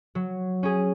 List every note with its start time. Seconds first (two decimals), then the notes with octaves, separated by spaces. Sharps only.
0.15 F#3
0.63 C#4 G#4